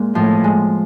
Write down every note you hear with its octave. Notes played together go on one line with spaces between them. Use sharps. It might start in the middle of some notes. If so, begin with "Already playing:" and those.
Already playing: A#2 G#3
A2 F3
G#3